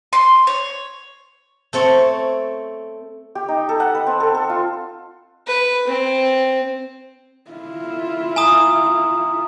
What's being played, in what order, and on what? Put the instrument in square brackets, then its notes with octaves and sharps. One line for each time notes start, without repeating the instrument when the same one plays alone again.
[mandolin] C6
C#5
[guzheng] A3 C4 A4 C#5
[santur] G4
D#4
A4
F#5
B4
C4
A4
A4
F4
[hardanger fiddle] B4
C4
[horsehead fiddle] E4 F4
[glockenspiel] G#5 A#5 D#6